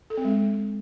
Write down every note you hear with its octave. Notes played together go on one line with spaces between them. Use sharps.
A4
C4
G#3